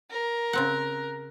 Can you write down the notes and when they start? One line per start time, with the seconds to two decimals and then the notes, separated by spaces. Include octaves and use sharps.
0.10 A#4
0.53 C#3 C4 F#5 F#6